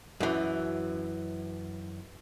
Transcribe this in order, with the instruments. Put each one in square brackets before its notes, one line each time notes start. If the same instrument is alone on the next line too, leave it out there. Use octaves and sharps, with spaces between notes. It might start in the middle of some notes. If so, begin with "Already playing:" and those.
[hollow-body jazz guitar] F#2 E3